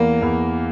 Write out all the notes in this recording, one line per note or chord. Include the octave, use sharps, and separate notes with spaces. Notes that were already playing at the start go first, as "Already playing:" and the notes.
Already playing: E2 A#3 A#4
E2